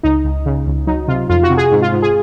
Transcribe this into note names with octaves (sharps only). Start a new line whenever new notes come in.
C#2 D#4
C#2
C#3
C#2
F#3 D#4
C3 F4
F2 F4
F#4
C3
G#4
G#2
F4
G#2
G#4